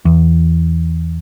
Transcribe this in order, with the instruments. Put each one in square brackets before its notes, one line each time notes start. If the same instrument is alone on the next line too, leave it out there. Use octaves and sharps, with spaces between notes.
[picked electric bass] E2